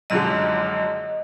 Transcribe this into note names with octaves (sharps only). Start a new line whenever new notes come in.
F#1 F#2 D3 F3 G#3 D#5